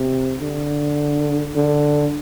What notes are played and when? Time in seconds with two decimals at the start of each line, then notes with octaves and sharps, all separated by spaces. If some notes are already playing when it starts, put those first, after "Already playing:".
Already playing: C3
0.41 D3
1.55 D3